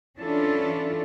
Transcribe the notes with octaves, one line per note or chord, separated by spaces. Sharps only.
E3 C#4 D4 E4 F4 A4